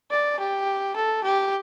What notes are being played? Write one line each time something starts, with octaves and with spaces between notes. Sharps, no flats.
D5
G4
A4
G4